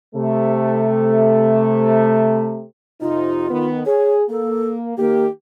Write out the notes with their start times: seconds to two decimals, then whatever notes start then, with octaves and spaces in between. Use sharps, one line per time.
0.15 C3 A3
3.01 F2 C3 D#4 F4
3.51 D#3 B3
3.86 G#4 C#5
4.30 A#3 A4
4.98 D#3 A#3 G4